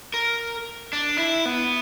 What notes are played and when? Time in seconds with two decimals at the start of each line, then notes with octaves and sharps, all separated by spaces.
0.14 A#4
0.93 D4
1.18 E4
1.45 B3